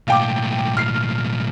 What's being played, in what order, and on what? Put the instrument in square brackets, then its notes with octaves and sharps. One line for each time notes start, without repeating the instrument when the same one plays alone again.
[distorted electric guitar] B1 A2 [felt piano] F5 G5 D6
[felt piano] F6 C7